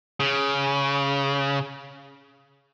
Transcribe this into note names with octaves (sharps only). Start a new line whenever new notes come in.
C#3